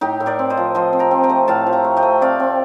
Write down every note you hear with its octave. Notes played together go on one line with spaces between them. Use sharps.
A2 D#4 G4
A2
A#4 D5
C4
C5 D#5
F3
F3 C5 D#5
C4
G5 A#5
C4
G5 A#5
A3
A2 F5 A5
F3
G5 A#5
A3
D#5 G5
A3
C4 D5 F5
C4